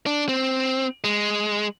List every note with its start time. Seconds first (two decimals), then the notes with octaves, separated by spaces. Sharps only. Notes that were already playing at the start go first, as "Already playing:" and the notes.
0.06 D4
0.29 C4
1.04 G#3